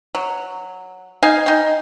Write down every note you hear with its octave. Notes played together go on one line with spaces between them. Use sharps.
F#3
D#4 F5 G#5
D#4 G5